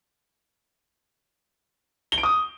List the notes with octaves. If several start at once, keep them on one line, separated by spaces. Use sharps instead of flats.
G7
D7
D#6